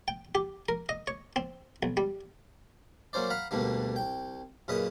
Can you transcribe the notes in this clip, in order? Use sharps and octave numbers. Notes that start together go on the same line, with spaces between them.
G5
G4
A#4
D#5
C#5
C4
B1
G3
F#3 A#3 C#4 C5 D5
F5 F#5 A#5 B5
D2 B2 D3 G3 A#3
C2 G5
F#2 A#2 C#3 B4 D#5 D#6